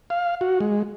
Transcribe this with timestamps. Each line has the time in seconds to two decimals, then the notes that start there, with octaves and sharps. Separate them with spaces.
0.10 F5
0.41 F#4
0.60 G#3